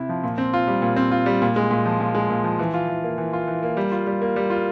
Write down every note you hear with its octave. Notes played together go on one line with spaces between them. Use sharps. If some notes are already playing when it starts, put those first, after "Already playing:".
Already playing: C3 E4
F3
A#2
C4
F4
G3
A#2
C4
F4
G3
A#2
G#3
A#2
F3
A#2
G#3
A#2
F3
E3
F4
E3
A#3
E3
F4
E3
A#3
G3
F4
G3
A#3
G3
F4